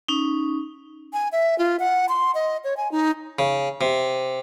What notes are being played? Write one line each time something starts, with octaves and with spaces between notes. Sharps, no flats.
C#4 D#4
G#5
E5
F4
F#5
C6
D#5
C#5
G#5
D#4
C#3
C3